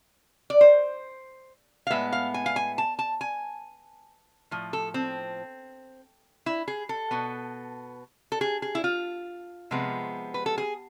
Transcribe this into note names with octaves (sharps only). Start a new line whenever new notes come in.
D5
C5
F5
A2 G#3 B3 E5
F5
G#5
F5
G#5
A5
A5
G#5
A2 F3
A4
C4
E4
G#4
A4
B2 B3
A4
G#4
G#4
E4
F4
C3 F3 G#3 B3
B4
A4
G#4